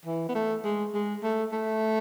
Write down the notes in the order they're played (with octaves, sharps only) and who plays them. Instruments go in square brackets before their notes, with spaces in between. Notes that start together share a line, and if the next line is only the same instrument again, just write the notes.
[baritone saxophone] E3
B3
A3
G#3
G#3
A3
A3